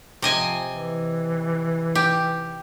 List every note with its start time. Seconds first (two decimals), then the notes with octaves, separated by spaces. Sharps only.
0.22 C3 F3 D#5 G#5
0.72 E3
1.95 G4